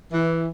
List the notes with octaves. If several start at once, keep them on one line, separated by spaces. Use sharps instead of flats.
E3